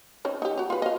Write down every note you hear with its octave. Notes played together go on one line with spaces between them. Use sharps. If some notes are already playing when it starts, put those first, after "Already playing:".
C4 C#4 D#4
D#4 G4
F#4 A#5
F4 B4
D#5 F5